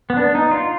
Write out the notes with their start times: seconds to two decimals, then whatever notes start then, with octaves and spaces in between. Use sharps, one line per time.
0.10 B3
0.17 D4
0.35 D#4
0.51 F4